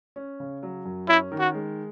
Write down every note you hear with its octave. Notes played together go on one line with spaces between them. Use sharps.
C#4
C#3
F#3
F#2
C#4 E4
D#3
F#4
G#3